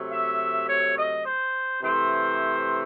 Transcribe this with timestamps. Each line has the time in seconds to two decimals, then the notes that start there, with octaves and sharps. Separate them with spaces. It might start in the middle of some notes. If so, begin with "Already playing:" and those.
Already playing: C3 F#3 A3
0.11 E5
0.68 C#5
0.97 D#5
1.25 C5
1.82 C3 E3 A3 C5